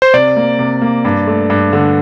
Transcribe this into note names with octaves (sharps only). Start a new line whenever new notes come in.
C5
C3 D5
A#3
C3
A#3
G2
A3
G2
D3